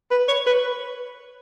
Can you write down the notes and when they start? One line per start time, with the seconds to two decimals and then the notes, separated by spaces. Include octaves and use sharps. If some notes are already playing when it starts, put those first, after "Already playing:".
0.11 B4
0.28 C#5
0.47 B4